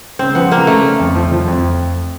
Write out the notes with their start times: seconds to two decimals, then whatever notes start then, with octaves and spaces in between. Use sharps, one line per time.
0.19 C#3 C4
0.35 F3 B3
0.52 C#3 A#3
0.67 C#3 A3
0.83 C#3
1.00 F2
1.16 F3
1.32 F3
1.48 F2